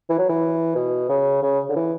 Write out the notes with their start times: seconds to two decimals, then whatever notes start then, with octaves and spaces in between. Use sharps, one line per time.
0.10 E3
0.19 F#3
0.29 E3
0.75 B2
1.09 C#3
1.42 C#3
1.69 D3
1.76 E3